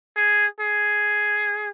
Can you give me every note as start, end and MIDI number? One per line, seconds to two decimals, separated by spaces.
0.17 0.46 68
0.60 1.71 68